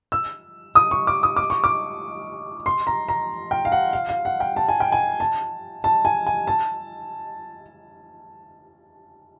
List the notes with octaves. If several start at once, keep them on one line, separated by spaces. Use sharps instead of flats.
E6
D#6
C#6
D6
D#6
D6
C#6
D6
C6
A#5
A#5
G5
F5
F#5
F5
F5
F#5
G5
A5
G#5
G5
G#5
A5
A5
G#5
G#5
A5